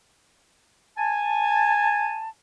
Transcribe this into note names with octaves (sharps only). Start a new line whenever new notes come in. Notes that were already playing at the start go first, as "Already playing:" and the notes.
G#5 A5